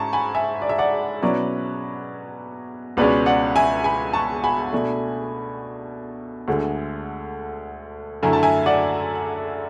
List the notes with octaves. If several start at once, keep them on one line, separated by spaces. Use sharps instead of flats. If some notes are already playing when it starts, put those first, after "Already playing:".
Already playing: G#2 G#3 C#4 E4 A5 C#6
G#5 B5
E5 G#5
D5
E5
D5 F#5
B2 F#3 C#4 E4 B4 D5
C#2 B2 G#3 C#4 B4 D5
D5 F#5
E5 G#5
G#5 B5
A5 C#6
G#5 B5
B2 A3 D4
D2 D3 G#3
F#2 D3 A3 E4 G#5
A5
E5 G#5
D5 F#5